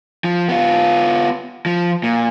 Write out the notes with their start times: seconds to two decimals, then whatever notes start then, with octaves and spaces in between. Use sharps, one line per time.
0.24 F3
0.49 B3 F4
1.66 F3
2.04 A#2